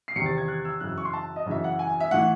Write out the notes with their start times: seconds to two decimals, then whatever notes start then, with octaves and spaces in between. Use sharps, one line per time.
0.08 C7
0.16 E2 C3 D#3 C#7
0.26 A6
0.38 G#6
0.48 F#6
0.65 E6
0.80 F#2 C#3 E3 F#6
0.89 E6
0.98 C#6
1.05 C6
1.13 A5
1.36 D#5
1.46 F#2 C#3 E3 E5
1.64 F#5
1.79 G#5
2.00 E5
2.11 A2 E3 F#5